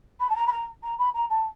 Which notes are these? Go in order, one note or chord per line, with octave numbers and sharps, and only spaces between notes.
B5
A5
A#5
B5
A#5
A#5
B5
A#5
A5